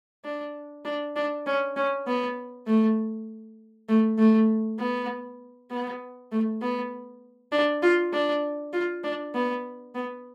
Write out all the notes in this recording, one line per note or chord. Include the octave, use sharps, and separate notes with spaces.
D4
D4
D4
C#4
C#4
B3
A3
A3
A3
B3
B3
A3
B3
D4
F4
D4
F4
D4
B3
B3